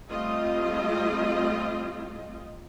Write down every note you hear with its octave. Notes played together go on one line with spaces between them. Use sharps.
G3 A3 C4 F4 D#5